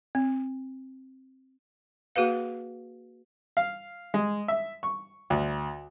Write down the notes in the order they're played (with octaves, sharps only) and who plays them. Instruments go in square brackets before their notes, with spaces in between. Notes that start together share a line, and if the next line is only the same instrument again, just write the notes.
[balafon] C4
A#3 F#4 G#4 B4 F5
[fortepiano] F5
G#3
E5
C#6
D2